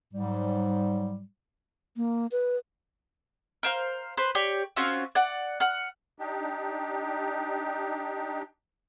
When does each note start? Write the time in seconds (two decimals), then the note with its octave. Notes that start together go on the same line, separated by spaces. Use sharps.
0.13 G#2 F#3 G3
1.96 A#3
2.32 B4
3.63 A#4 C5 F5
4.17 B4 C5
4.35 G4 C#5 D5
4.76 C4 C#4 F4 F#4
5.15 D5 F#5
5.60 F#5 F6
6.19 D4 D#4 G4